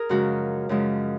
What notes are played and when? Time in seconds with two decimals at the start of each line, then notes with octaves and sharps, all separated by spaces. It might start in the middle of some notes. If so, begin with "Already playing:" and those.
Already playing: G#4 A#4
0.09 F#2 C#3 F3 G#3 F#4
0.69 F#2 C#3 F3 G#3